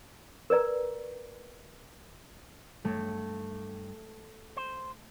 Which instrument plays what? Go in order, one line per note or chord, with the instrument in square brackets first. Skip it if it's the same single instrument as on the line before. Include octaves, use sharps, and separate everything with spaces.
[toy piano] A#4 B4 D5 A#5
[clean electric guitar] G2 [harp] A3
[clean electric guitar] C5